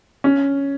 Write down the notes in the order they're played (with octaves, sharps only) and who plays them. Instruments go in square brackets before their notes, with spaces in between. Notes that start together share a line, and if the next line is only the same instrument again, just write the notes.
[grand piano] C#4